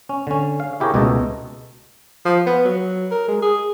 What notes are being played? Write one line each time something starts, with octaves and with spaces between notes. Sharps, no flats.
C#4
D3 C#4
F5
E4 G4 G#4 A#4 C#5
C#2 B2 A3 A4 D#5 A#5
F3
B3
F#3
A#4
G#3
G#4